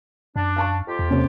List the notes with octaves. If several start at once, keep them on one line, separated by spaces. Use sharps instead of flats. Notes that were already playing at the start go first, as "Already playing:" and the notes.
F#2 D4
F5 A5 C#6
F2 F4 G4
E2
C3 A#3 C#4